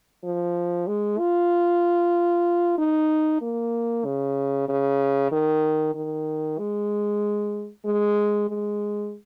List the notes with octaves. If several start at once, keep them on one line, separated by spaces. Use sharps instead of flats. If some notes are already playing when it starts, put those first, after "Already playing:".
F3
G#3
F4
D#4
A#3
C#3
C#3
D#3
D#3
G#3
G#3
G#3